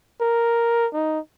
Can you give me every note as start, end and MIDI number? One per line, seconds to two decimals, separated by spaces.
0.21 0.87 70
0.93 1.19 63